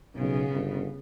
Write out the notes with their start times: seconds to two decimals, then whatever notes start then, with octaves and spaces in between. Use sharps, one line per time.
0.16 B1 C#3 B3
0.52 G1